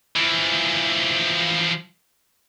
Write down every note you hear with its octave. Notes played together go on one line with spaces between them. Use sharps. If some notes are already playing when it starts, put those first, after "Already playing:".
E3 F3